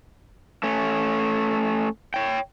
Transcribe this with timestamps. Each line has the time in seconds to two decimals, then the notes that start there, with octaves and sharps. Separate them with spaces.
0.63 A3 C#4
2.14 C#5 G5